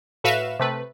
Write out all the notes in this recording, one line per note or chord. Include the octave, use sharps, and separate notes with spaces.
A2 F#4 B4 E5 F5 E7
C3 A3 B4